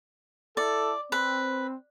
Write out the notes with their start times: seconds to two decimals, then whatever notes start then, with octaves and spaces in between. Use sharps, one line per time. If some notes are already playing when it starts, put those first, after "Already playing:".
0.57 E4 A4 D5
1.12 C4 B4